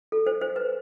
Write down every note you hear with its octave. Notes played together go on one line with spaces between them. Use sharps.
A4
C5
C5
B4